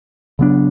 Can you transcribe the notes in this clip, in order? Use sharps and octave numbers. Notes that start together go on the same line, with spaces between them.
C#3 F#3 B3 D4